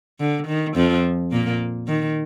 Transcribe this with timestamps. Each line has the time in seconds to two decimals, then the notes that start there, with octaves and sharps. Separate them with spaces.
0.20 D3
0.47 D#3
0.76 F2 F3
1.31 A#2 A#3
1.87 D#3